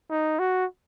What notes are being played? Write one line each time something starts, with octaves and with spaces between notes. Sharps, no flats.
D#4
F#4